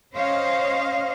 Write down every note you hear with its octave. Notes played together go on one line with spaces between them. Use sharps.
C#4 C5 C#5 D#5 F5